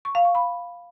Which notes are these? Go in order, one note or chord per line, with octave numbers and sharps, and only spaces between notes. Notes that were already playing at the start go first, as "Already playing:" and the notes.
C#6
F5
C#6
B5